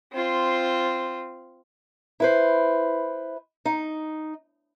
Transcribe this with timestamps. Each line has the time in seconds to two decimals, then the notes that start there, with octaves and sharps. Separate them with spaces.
0.13 C4 F4
2.20 E4 B4 C5
3.65 D#4